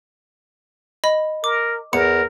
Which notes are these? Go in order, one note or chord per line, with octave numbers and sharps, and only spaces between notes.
D#5 B5
A#4 D6
E2 A#4 C#7